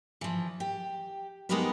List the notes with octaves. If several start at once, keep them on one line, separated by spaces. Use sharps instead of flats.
E3 F3
G4
G#3 B3 D#4 G4 A#4 B4